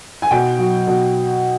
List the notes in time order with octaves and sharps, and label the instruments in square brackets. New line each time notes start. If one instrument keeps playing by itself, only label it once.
[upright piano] G#5
B2 G5
F#3
B2